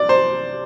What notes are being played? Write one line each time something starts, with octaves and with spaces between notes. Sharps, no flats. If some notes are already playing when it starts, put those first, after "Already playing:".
Already playing: C2 D5
C5